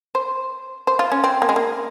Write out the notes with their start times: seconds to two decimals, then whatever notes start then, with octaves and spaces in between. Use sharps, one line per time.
0.15 C5
0.87 C5
0.99 F4
1.12 C#4
1.24 C4
1.42 A#3
1.49 G#3
1.56 A#3